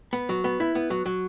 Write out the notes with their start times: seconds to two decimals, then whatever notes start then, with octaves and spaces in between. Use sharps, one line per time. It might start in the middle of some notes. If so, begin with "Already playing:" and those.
0.13 B3
0.29 F#3
0.44 B3
0.60 E4
0.75 B3
0.90 F#3
1.06 F#3